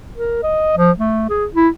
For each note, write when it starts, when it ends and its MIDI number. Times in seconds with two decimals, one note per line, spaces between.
0.16 0.41 70
0.43 0.77 75
0.77 0.92 53
0.99 1.28 57
1.29 1.46 68
1.55 1.69 64